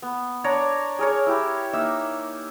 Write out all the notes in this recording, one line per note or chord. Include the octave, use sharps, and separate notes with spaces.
B3
D4 C#5 D5 A#5
G#4 A#4 C#5
E4 G4
A#3 D#4 E5